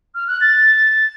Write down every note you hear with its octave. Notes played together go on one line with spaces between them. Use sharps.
F6
F#6
A6